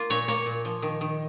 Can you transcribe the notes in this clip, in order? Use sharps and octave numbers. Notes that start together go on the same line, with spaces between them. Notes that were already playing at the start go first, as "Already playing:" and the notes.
Already playing: A#3 F4
A#2 C#5
A#3 C#5
A#2
F3
D#3
D#3